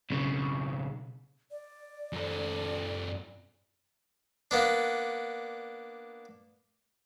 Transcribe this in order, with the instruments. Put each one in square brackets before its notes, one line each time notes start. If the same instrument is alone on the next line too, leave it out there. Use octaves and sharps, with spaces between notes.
[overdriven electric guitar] B1 C#3
[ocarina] D5
[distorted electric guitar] F#2 A4
[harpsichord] A#3 B3 D4